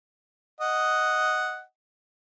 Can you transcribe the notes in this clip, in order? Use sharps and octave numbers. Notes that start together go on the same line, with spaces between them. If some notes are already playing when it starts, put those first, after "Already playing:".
D#5 F#5